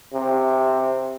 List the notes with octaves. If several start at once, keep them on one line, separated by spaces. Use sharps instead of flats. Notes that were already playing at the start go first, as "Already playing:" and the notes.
C3